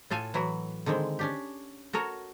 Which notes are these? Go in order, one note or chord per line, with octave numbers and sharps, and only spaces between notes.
A2 F4 A4 F5 G#5
E3 F#3 E4 F#4
D3 D#3 G#3 C4
C#4 D4 G4
F#4 A4 A#4 C#5